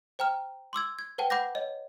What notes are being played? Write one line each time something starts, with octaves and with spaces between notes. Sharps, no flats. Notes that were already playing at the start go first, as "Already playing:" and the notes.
C5 G5 A#5 F6
C6 D6 E6 G#6
G#6
B4 C5 F#5 G5 A5
F#5 B5 D6 G6 A#6
C#5 D#5